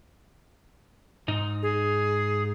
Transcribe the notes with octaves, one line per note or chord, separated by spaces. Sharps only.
G#2 D#4
G#4